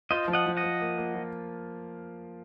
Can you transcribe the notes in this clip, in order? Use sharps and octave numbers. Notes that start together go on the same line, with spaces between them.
F4 C5 D#5
F3
D#5 F#5
F3
D#5 F#5
F3
A#3
A#3
F3